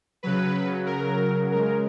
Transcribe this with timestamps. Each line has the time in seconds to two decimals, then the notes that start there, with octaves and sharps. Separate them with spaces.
0.23 C#3 F#3 B4
0.86 A#4
1.50 C#3 G#3 A#4